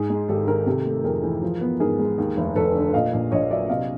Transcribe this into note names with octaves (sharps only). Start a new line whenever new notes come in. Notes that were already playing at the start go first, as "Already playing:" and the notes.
Already playing: G#2 G#4
G#3
G#1 G4 A4
D#3 G#4 A#4
C3 G4 A4
A3
F2 G#4 A#4
E3
F3
B3
G#2 G#4 A#4
G#3
D#2
F1
F1 A4 B4
D3
A#2 D#5 F5
A#1
A#1 C#5 D#5
F#3 D5 E5
C3 D#5 F5